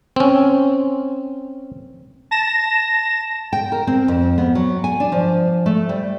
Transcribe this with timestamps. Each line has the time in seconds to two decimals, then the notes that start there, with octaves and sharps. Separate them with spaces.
0.16 C4 C#4
2.31 A5 A#6 E7
3.53 G5
3.72 A#4
3.87 C4
4.08 F2
4.38 B3
4.55 F#3
4.84 G#5
5.00 D4
5.12 F3
5.66 A3
5.89 G3